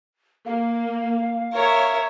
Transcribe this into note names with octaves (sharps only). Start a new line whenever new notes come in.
A#3 F5
A#4 C#5 E5